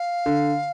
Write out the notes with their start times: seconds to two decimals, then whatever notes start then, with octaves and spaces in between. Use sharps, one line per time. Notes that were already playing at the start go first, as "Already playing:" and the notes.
Already playing: F5
0.26 D3